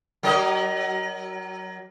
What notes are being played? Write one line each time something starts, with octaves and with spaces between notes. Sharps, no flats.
F#3 A#4 D#5